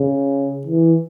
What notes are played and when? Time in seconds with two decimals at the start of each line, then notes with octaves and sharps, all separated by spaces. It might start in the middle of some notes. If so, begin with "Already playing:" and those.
Already playing: C#3
0.67 E3